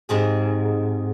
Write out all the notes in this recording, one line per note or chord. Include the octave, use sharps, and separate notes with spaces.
G#2 C3 G#4